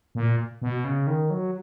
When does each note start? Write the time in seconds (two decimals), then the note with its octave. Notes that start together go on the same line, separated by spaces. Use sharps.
0.15 A#2
0.62 B2
0.84 C#3
1.07 D#3
1.30 F#3